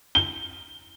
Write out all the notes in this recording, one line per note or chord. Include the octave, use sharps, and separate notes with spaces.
G7